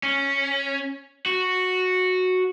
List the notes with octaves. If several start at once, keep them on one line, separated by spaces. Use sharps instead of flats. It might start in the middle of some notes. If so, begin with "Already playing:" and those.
C#4
F#4